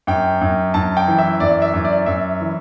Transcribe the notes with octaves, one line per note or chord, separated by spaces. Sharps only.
F#2 G5
F#2
F#2 A5
G5
E3
E5
F#2 D5
E5
F#2
D5
F#2 E5
E3